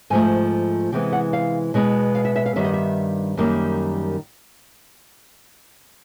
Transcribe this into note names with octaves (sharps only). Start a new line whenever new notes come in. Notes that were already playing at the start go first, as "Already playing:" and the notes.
G#2 F3 A3 G#5
C3 E3 G#3 B3 G5
F#5
F5
B2 G#3 B3
F5
E5
E5
F5
G2 D#3 G3 B3 E5
D#5
E5
F#2 D#3 G3 A#3